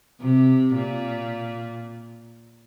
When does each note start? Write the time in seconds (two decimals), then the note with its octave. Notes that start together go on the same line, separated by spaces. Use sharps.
0.20 C3
0.75 A#2